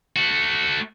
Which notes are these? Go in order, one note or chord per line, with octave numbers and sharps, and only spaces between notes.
A3 F#4